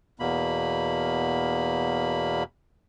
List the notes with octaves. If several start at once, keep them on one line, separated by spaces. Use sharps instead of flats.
E2 B2 A#3 B5